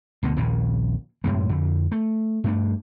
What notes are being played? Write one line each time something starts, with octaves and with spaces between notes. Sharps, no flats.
D2 B2 D3
A#1 D#2 A#2 C#3
F#2 A2 C3 G#3
F2 D3
A3
G2 A3 D4